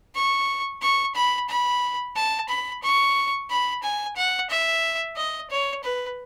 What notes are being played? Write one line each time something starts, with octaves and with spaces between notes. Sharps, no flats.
C#6
C#6
B5
B5
A5
B5
C#6
B5
G#5
F#5
E5
D#5
C#5
B4